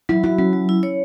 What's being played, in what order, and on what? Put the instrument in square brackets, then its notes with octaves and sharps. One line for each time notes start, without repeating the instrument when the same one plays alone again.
[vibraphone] F#3 [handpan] E4
[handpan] E4 [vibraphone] F#4
[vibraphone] F#3 [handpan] C#4
[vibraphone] F#3
E4
C#5